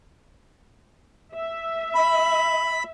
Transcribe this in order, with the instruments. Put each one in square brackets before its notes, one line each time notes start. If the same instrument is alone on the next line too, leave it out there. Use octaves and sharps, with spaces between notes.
[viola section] E5
[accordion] B5